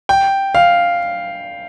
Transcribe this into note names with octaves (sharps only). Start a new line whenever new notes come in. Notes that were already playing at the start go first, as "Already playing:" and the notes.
G5
F5